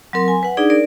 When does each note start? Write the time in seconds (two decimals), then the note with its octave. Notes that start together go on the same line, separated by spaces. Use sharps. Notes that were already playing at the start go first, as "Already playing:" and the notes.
0.13 F#3 C4 A#4 C6
0.28 G#5
0.43 B4 F#5
0.57 D4 D#4 G#4 D5
0.70 A#4 D5